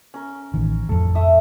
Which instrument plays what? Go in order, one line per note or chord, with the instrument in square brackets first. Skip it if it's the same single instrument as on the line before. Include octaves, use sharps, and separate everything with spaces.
[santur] C#4 A#4
[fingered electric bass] A1 D#3
[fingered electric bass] F2 A2 [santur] A4
[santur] A3 E5 D#6